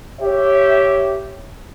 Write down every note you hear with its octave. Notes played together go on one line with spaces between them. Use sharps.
G4 C#5 E5